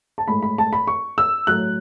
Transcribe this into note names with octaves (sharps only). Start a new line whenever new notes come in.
A5
A2 G#3 B5
B5
A5
B5
C#6
E6
A2 F#3 F#6